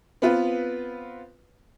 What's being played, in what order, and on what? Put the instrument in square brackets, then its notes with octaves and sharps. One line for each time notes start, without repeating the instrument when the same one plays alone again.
[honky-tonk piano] B3 C4 F4 B4